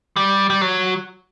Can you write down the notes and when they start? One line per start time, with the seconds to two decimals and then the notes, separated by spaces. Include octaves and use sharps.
0.16 G3
0.50 G3
0.61 F#3